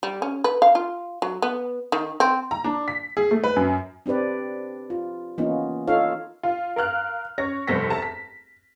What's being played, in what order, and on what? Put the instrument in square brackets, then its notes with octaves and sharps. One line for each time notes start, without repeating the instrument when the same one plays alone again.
[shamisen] G3
C#4
B4
F5
F4
F#3
B3
D#3
C4
[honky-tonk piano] A#5
D4
B6
G#4
A3
B4
F#2
[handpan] C4 D4 G4 B4 D5
F4
E3 A#3 B3 C#4 D#4 F4
D#4 F4 A4 C#5 F5
[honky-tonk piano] F4
A#4 F5 F6 F#6
C#4 C#5 A#6
F1 C2 C5 A#6 B6
E5 A5 A#5
B6